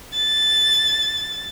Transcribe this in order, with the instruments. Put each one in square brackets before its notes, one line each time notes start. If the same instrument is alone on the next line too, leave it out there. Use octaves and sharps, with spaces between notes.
[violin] A6